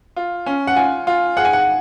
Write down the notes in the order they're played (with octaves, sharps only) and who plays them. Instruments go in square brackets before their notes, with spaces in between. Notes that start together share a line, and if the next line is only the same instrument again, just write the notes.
[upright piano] F4
C#4
[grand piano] F#5
[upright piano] F4 [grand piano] G#5
[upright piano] F4
[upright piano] G#4 [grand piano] F#5
[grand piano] G#5
F#5